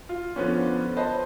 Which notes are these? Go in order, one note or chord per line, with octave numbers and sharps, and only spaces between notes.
F4
D3 F3 B3 C#4
B4 C5 D#5 A5 B5